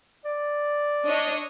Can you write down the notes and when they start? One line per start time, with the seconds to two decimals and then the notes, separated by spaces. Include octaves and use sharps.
0.25 D5
1.06 D4 C#5 D#5